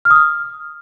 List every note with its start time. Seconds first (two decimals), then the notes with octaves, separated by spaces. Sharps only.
0.05 F6
0.11 D#6
0.16 F6